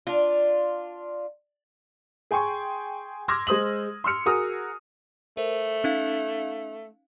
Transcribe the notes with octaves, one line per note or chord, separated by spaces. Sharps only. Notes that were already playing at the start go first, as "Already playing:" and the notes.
D4 F4
G#4 G5 G#5 C6 C#6
C6 D6 E6 F6 G#6 A#6
G#3 C5 D#6 F#7
C6 E6 F6 C#7
F#4 G#4 A#4 D#6 F6
A3 A#4 C5
C#4 D#4 F5